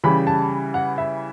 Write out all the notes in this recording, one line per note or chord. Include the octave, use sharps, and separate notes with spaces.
C#3 E3 G3 B5
A5
F#5
E5